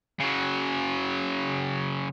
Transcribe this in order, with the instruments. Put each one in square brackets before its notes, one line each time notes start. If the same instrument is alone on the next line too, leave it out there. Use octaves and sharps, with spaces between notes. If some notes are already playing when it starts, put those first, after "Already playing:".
[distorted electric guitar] C#3 F#3